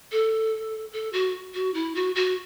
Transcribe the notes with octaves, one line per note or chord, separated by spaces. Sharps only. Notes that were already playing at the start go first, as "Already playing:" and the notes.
A4
A4
F#4
F#4
E4
F#4
F#4